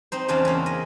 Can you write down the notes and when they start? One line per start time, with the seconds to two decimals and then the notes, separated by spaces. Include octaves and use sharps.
0.12 C4 D#4 C5
0.28 E2 C#3 C#4 D4 C5 F5
0.45 A#3 C#4
0.66 D#5